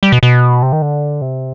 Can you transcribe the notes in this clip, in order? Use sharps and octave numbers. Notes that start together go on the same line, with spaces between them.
G3
B2
B2
C3
D#3
D3
C3